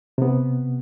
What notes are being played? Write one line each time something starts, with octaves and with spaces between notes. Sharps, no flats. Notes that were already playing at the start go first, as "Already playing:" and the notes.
C3 B3